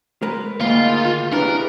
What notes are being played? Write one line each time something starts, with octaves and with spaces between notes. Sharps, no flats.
G#3 A#4 B4
D2 G#2 D#3 A#3 F4 B5
D4 E4 G4 G#4 A#4 B4 C#5